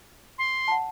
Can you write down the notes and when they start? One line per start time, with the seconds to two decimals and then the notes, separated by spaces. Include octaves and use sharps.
0.38 C6
0.68 F#5 A5